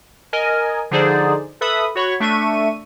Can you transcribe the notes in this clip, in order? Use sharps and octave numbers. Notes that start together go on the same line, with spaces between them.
A#4 D#5 G#5
D3 F3 D#4 G#4 C5 D5
A4 B4 E5 B5 D#6
F#4 C#5 B5 C#6
A3 D4 E5 C#6 D#7